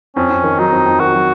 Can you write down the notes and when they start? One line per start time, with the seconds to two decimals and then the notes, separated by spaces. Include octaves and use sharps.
0.16 F2 C#4
0.30 F2
0.44 D#3
0.58 F#3 D#4
0.72 F2
0.86 F2
1.00 D#3 F#4
1.14 F#3